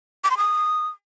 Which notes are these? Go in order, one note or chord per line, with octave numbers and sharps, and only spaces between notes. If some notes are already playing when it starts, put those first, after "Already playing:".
D6
C6
D#6